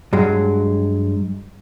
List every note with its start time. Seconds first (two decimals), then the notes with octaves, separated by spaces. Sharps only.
0.13 G2 F#3 G#3